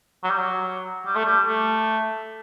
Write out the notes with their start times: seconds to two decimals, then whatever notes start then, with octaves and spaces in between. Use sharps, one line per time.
0.24 F#3
0.31 G3
0.38 F#3
1.06 G3
1.16 A3
1.25 G3
1.47 A3